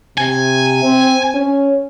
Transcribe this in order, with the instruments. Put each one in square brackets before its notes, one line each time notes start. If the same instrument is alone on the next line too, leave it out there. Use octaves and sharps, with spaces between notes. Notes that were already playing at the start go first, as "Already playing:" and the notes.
[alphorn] C3 [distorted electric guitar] G#5
[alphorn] C4
C#4